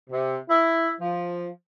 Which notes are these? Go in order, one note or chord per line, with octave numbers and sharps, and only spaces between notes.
C3
E4
F3